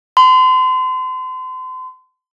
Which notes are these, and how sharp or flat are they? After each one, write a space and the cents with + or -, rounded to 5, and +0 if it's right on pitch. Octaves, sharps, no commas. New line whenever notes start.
C6 -35